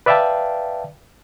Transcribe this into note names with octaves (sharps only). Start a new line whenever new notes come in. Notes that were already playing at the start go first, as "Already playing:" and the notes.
B4 D5 E5 F5 G5 A5